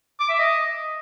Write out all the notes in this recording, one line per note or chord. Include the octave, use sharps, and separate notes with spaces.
D6
E5
D#5